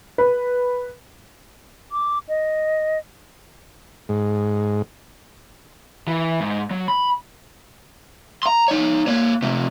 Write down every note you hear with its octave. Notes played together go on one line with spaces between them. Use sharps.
B4
D6
D#5
G#2
E3
G#2
F#3
B5
A#5 C6
D#4 C#5
A#3 C#5
C3 A3